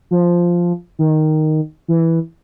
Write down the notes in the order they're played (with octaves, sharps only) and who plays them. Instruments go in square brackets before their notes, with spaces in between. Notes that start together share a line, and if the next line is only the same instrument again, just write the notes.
[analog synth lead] F3
D#3
E3